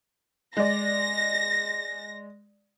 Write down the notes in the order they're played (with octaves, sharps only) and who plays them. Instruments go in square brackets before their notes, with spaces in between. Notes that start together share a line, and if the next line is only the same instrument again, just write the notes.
[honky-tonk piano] G#3 D5 [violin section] A#6